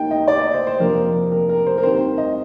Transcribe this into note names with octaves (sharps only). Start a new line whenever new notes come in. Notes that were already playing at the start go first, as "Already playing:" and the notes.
Already playing: D#2 D#3 A#3 D#4 G5
D#5
D5
D#5
C5
C5
F2 C3 F3 A#3 D4 A#4
A#4
A#4
C5
A#4
D#2 D#3 G3 C4 C5
D#5